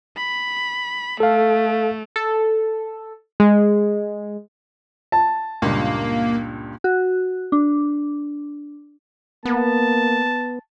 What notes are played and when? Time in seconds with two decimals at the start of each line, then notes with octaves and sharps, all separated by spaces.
0.17 B5
1.20 A3 A4 F5
2.16 A4
3.40 G#3
5.12 A5
5.62 C#2 G2 A#2 A#3
6.84 F#4
7.52 D4
9.45 A#3 B3 A5